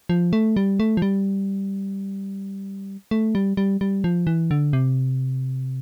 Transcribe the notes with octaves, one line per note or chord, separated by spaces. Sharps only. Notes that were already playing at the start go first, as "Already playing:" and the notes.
F3
A3
G3
A3
F3
G3
A3
G3
G3
G3
F3
E3
D3
C3